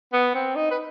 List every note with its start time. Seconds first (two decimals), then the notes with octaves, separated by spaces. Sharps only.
0.13 B3
0.35 C4
0.56 D#4
0.71 B4